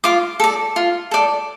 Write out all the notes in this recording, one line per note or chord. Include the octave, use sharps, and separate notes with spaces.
F4 D6
A4 D5
F4
A4 D5